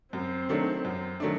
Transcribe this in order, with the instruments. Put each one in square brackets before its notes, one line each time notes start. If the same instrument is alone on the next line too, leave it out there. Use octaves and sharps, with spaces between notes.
[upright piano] F#2 [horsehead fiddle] C4
[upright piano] D#3 F#3 A3 D4
F#2
D#3 F#3 A3 D4